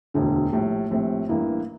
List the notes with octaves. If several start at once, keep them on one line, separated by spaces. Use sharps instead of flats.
E1 D2 D3
A#1 A2 G3
A#1 A2 G3 C4
A1 G2 E3 A#3 E4